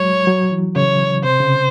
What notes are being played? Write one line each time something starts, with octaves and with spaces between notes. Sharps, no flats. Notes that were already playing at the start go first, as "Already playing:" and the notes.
Already playing: F#3 G#3 C#5
F#3
E3
C#3 C#5
C3 C5
C#3